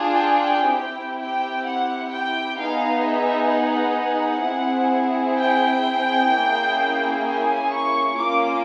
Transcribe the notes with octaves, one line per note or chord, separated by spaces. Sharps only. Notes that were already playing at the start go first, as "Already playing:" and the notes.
Already playing: D4 F4 G#4
G5
G5
C4 E4 G4 G5
G5
F#5
G5
B3 D#4 G#4 F5
E5
F#5
C4 E4 G#4
G5
A#3 C#4 E4 G#4
G#5
C#6
A#3 C#4 F4 D6